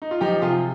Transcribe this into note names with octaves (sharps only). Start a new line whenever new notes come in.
D#4
F4
F3 D#4 G4
C3 F4 G#4